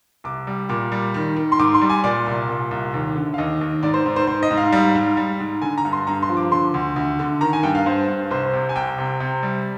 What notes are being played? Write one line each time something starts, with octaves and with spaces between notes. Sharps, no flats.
C2 D6
G3
A#2 D6
G3
D#3
D#3
C6
G#2 D6
C6
G3
G#5
A#2 D5
C2
A#2
C2
D#2
D3
F5
D#2 D#5
D#2
G#2 D5
C5
G#2
C5
G#2 C5
D#5
G#2
F5
G3
G#2
G3
G#2
D3 G#5
A#5
G2
C6
G2 A#5
C6
F3
D6
D3 C6
D2
D2
D3
D#3 A#5
G#5
G2 G5
F5
G2 C5
G2
C2 C5
C5
C3
G#5
C2 G5
C3
C3
G3